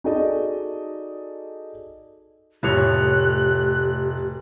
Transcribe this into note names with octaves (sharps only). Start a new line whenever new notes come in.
D#4 F#4 G#4 A4 D5 D#5
F1 A2 G4 C#5 F#6 F7